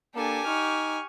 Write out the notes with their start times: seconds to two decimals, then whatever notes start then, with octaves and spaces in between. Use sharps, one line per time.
0.15 A#3 D4 G4 A4 G#5
0.47 D#4 C#6 F6